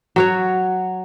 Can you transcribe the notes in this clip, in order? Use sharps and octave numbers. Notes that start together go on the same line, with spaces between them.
F#3 F#4 C#5